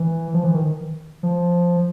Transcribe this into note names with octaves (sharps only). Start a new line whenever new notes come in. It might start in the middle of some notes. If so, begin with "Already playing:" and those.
Already playing: E3
F3
E3
D#3
F3